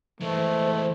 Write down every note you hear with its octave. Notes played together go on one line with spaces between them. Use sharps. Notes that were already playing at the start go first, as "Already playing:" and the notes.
E3 G#3 A3 C5